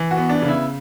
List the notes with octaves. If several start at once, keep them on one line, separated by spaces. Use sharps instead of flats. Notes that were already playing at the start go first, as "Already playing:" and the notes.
Already playing: E3
F#4
B3
D4
C#3
E4